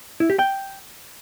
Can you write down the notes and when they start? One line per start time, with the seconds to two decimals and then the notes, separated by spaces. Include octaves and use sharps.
0.20 E4
0.30 G4
0.39 G5